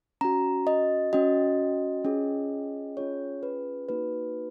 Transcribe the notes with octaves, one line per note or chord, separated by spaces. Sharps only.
C#4 F#4 A#5
D#5
C#4 F#4 D#5
C#4 F4 G#4
C#4 F4 G#4 C#5
B4
A#3 D#4 F#4 B4